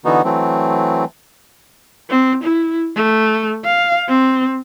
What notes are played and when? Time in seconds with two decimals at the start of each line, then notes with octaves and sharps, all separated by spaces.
0.05 D3 E3 B3 D#4 F#4
0.24 E3 F#3 A3 C4
2.09 C4
2.44 E4
2.96 A3
3.64 F5
4.08 C4